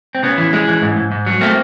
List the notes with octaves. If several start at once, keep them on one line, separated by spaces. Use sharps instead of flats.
C4
C#3 B3 C#4
E3
G#3
E3
G#2
G#2
G#2
F#3
A3 A#3 C4